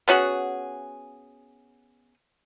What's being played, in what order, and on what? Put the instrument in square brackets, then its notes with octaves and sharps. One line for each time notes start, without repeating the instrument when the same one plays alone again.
[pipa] B3 C#4 F#4 G#4